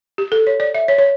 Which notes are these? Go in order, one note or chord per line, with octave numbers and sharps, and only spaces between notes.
G4
A4
C#5
D5
E5
C#5
C#5